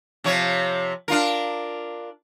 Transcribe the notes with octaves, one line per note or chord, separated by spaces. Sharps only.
C3 F3 C#5
D4 F4 A#4